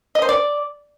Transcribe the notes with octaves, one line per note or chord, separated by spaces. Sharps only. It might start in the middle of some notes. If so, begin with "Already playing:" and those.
D#5
C5
D5